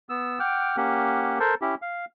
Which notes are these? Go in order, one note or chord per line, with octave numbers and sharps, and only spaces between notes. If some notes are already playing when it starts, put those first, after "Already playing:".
B3 E6
F#5 G5 D6 F6
A#3 C#4 G4 F#5
A4 A#4 C5
C#4 E4 G4
F5